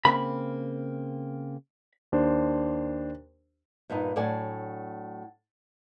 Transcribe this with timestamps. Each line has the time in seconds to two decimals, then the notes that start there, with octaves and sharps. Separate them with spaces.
0.05 C#3 A#3 C4 B5
2.12 D#2 D4 C5
3.90 G2 A#2 B3 D#4
4.16 A2 F#3 D4 D5 F#5 G#5